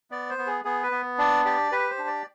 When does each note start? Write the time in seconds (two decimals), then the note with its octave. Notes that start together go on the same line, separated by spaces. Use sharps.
0.11 B3 D5
0.30 C5
0.38 B3
0.47 G#4
0.65 B3 G#4
0.83 B4
0.91 B3
1.18 D4 D5
1.45 G4 D5
1.72 G4 B4
1.90 C5
1.99 D4
2.07 D5